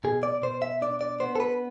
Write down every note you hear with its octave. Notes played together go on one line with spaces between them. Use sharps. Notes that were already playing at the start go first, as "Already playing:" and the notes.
B2 G#4
D5
B2 C5
E5
D4 D5
D5
B3 C5
A4
B4